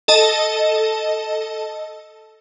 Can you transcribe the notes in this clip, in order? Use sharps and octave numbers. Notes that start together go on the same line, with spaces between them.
A4 D#5 A5